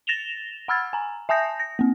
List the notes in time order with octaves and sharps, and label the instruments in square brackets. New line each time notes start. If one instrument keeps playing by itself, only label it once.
[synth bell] A6 A#6 E7 F7 G7
F#5 B5 E6 F6 G#6 A6
G#5 A#5
E5 G#5 A5 D#6 G6 A#6
A#6
A#3 C4